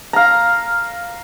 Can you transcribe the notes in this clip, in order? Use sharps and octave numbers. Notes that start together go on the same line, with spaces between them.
F5 A#5